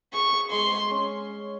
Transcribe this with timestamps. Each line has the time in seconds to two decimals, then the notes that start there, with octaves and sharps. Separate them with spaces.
0.13 G#4 C#6
0.32 G#4
0.51 G#3 C6
0.71 G#4
0.91 C#4